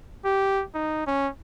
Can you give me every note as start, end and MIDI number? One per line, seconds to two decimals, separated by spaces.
0.25 0.63 67
0.74 1.02 63
1.07 1.28 61